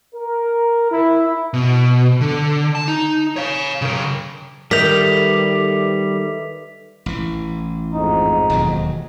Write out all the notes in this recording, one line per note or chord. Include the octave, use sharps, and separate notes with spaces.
A#4
E4
B2
D3
A5
D#4
C#5 F5
C#3 A#4
D#3 G3 A4 B4 E5 G6 B6 F7
A1 E3
F2 G#2 D#4
E1 D#2 F#3